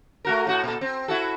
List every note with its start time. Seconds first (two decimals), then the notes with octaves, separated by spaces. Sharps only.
0.25 A3 F#4 A#4
0.47 A2 F#4
0.64 A#2 A4
0.81 C4
1.08 E4 F#4 A4